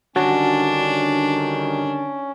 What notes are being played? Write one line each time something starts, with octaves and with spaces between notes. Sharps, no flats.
D3 D#3 G3 C#4 D4 F#4 C#5 A5